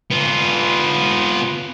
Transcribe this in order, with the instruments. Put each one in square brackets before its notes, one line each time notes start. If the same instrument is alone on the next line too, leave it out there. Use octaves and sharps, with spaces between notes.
[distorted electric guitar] B3 F4